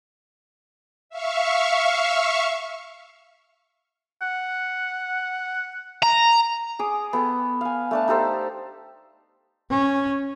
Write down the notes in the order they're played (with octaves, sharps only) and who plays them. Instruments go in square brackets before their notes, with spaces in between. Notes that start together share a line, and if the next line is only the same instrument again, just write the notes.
[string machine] E5 F5 C#6
[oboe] F#5
[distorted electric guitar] A#5
[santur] G#4 D6 D#6
B3 A4 G5
F5 G#5
A3 D4 A5
D#4 G4 A4 C5
[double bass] C#4